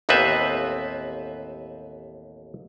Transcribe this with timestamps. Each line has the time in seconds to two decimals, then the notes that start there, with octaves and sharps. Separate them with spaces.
0.09 A1 D#2 B3 C4 B4 E5